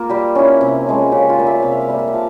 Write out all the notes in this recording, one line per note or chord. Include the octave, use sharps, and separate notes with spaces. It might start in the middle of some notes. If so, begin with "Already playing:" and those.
Already playing: A#3 F4 A#4
G3 G4
C#4 E4
C3
F3 G#3 C#4
C#3 G4
F4
G3 A#3
E5
F5
C3 E5
F5
E5
G3 A#3 F5
E5
F5
F3